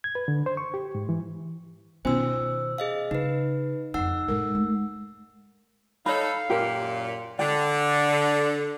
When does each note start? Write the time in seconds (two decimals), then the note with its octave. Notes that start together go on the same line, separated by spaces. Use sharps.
0.04 G#6
0.15 B4
0.28 D3
0.46 C5
0.57 C#6
0.74 G4
0.95 G#2
1.09 E3
2.05 B2 D#3 B3 C#4 F4 C5 E6
2.78 G#4 D#5 F5
3.11 C#3 D#4 B4
3.94 F2 D#4 F4 F#5 E6
4.28 A2 G#3 A#4
4.55 G#3 A3
6.06 D#4 A4 C#5 F5 B5
6.50 F#2 A#2 G4 A#4
7.39 D3 A4 D5 G5